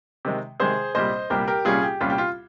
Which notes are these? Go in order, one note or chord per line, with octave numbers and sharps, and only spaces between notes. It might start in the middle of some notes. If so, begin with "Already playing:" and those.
C3 D#3 G#3
C3 D#3 G#3 G#4 C5
C2 A#2 G3 C5 D#5
C2 A#2 G3 G4 A#4
G4 A#4
C2 A#2 G3 C#4 F4 G#4
G4
C2 A#2 G3 C#4 F4
G4
F4